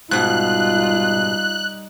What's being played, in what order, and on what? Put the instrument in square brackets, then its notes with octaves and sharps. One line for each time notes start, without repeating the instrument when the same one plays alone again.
[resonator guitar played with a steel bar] G#2 B2 [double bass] G3 D#4 [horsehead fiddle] F4 [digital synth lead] F#6